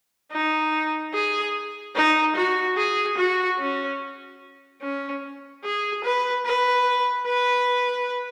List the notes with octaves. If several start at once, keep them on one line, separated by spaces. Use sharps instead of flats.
D#4
G#4
D#4
F#4
G#4
F#4
C#4
C#4
G#4
B4
B4
B4